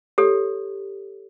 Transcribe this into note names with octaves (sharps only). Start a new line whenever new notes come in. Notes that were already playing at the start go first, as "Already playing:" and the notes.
G4 A4 C#5